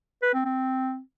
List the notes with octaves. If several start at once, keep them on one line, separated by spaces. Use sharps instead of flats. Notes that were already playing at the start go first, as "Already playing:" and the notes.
B4
C4
C4